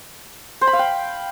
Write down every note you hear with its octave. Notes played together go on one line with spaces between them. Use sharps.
C5
B5
F5
G5